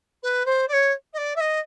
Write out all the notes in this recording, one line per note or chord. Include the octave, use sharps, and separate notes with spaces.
B4
C5
D5
C#5
D#5
D5
E5
D#5